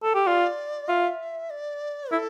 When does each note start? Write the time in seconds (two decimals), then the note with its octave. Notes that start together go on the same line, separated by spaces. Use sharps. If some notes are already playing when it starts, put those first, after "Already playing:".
0.03 A4
0.15 G4
0.27 F4 D5
0.88 F4 E5
1.50 D5
2.12 E4 A4